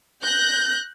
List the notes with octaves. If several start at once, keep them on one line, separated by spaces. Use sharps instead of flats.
F#6 G6 A#6